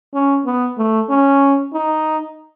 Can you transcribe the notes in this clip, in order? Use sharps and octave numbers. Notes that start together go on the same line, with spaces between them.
C#4
B3
A3
C#4
D#4